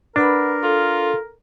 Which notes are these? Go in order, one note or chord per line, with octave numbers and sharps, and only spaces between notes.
D4 A#4 B4 F#5 B5
F4 A4